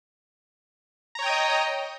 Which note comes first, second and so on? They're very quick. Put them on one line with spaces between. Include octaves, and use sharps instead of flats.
A#5 C#5 G5 D#6 D#5